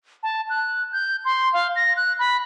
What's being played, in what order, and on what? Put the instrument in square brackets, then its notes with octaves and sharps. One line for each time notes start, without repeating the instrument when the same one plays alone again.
[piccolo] A5
F#6
G6
C6
F5
A#6
F#6
B5